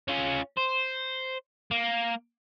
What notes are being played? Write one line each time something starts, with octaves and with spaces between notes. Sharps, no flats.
C#4 F4
C5
A#3